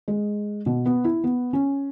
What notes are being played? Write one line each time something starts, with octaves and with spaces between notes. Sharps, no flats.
G#3
B2
B3
E4
B3
C#4